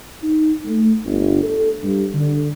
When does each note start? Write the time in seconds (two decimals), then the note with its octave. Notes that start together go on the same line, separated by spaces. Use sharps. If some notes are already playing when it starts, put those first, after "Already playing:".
0.23 D#4
0.65 A3
1.05 G1
1.43 A4
1.83 G2
2.14 D3